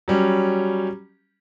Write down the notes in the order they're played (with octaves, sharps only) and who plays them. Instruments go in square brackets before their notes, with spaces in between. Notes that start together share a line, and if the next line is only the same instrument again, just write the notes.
[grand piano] F#3 G3 C#4